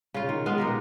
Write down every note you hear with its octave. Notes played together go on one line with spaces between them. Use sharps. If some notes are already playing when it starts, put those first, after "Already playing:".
C#3 F4
D#3
G#3 B3 F4 F5
D#4 G4 A#4